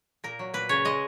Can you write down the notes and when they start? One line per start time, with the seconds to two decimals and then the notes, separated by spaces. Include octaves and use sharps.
0.24 A#2 A#4
0.39 F#3
0.54 A#2 B4
0.69 C#3 C#5
0.85 G#3 D#5